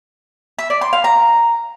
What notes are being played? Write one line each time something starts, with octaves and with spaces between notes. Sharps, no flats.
E5
D5
C6
F5
A#5